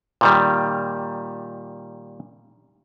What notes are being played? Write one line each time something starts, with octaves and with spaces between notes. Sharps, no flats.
A#2 D#3 G3